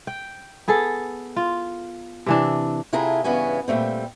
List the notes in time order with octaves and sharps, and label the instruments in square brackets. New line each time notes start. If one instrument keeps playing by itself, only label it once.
[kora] G5
B3 G#4 A4
F4
C3 E3 D4
[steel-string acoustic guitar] C3 E4 F4 G#4 A4 A#5
G2 C#3 E3 B3 C#4 G#5
A#2 G3 A3 C4